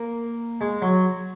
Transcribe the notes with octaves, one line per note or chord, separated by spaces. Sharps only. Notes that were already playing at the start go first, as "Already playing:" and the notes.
Already playing: A#3
G#3
F#3